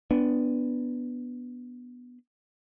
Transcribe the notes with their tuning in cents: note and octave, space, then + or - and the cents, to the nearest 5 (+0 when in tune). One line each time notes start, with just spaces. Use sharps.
B3 +0 D4 +0